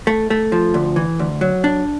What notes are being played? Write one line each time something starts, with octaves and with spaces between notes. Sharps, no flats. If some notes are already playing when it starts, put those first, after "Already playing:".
A3
A3
F3
D2
E3
D2
F#3
D4